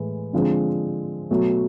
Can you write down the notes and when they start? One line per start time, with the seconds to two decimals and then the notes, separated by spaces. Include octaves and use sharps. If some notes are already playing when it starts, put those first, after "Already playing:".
Already playing: A2 E3 G#3
0.33 D3 F3 G#3 C4
1.31 B2 F#3 A3